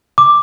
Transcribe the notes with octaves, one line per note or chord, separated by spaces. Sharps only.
D6